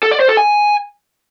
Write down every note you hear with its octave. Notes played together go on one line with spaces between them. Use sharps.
A4
D5
C5
A4
G#5